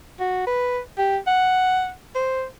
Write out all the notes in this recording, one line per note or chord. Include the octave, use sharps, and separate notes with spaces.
F#4
B4
G4
F#5
C5